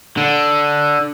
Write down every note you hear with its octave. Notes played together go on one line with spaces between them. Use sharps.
D3